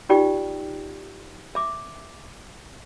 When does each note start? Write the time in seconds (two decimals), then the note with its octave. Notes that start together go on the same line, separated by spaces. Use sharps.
0.09 D#4 F4 G4 D5 G5
1.55 E5 D6